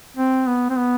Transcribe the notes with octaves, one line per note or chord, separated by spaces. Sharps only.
C4
B3
C4
B3